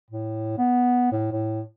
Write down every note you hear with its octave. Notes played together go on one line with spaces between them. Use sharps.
A2
B3
A2
A2